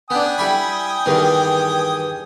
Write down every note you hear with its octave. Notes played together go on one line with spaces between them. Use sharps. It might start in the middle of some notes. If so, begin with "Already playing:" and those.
B3 D4 G5 G#5 D#6
G3 E4 B5
E2 G2 D#3